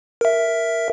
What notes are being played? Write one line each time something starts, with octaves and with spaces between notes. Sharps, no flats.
A#4 E5